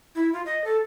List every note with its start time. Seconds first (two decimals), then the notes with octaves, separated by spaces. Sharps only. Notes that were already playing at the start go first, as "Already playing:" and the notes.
0.15 E4
0.33 F4
0.46 D#5
0.64 A4